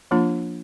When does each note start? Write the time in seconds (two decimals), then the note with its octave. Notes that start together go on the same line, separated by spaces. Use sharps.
0.11 F3 A#3 D4 F4